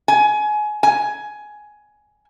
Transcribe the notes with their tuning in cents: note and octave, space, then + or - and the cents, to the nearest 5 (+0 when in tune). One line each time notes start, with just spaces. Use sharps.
G#5 +25
G#5 +15